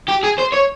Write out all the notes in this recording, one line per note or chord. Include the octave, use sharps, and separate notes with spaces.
G4
G#4
C5
C#5